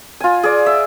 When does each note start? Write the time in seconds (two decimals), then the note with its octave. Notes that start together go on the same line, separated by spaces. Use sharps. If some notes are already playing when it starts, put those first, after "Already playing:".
0.20 F4 G#5
0.43 G#4 D5
0.66 E5